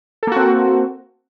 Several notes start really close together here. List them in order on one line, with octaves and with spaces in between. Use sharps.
A4 A#3 F#4 C4